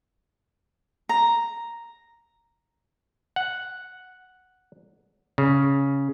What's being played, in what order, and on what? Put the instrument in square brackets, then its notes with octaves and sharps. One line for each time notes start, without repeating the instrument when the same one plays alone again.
[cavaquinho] A#5
[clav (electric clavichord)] F#5
C#3